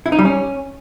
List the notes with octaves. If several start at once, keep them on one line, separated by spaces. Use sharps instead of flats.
E4
D#4
G3
C#4